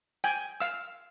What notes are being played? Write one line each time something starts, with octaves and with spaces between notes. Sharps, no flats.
G5 G#5
F5 E6